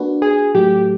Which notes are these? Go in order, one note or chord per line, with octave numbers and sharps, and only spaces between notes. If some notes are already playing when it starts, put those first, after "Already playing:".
Already playing: A#3 D4 F#4 B4
G#4
A2 F#3 A3 G4